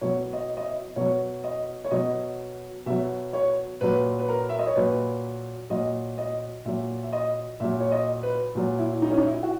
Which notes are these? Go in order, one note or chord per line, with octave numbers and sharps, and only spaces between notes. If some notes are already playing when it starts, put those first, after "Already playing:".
B2 F#3 C#5
D#5
D#5
E5
B2 F#3 C#5
D#5
C#5
B2 F#3 D#5
B2 F#3 E5
C#5
A#2 F#3 B4
B4
A#4
E5
D#5
C#5
A#2 F#3 B4
A#2 F#3 D#5
D#5
A#2 F#3 E5
E5
D#5
A#2 F#3 E5
C#5
D#5
B4
A#2 F#3
E4
D#4
C#4
D#4
E4
F#4